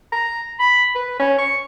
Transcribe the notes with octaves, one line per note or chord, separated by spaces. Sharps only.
A#5
B5
B4
C#4
C#6